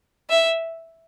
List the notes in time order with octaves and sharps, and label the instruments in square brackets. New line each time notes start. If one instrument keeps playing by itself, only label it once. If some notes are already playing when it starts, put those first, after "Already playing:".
[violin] E5